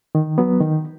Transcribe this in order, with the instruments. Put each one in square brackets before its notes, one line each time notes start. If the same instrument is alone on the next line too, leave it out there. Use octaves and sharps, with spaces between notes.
[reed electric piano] D#3
F#3 B3
D#3